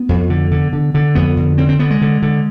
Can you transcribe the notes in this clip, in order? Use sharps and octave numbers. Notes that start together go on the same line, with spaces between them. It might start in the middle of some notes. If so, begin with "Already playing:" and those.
Already playing: B3
F2
D3
D3
D3
D3
F2 B3
D3
D3 C4
C4
D3 B3
G#3
D3
D3